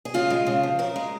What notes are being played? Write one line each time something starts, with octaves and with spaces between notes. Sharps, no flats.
G#4
C#3 F4
G#3
C#3
F3
C#3 A#4
G#3